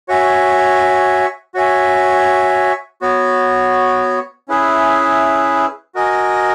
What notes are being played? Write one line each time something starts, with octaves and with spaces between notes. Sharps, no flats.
F#4 C#5 E5 G#5
F#4 C#5 E5 G#5
B3 F#4 C#5
C#4 E4 G#4 B4 E5
F#4 A#4 D#5 G#5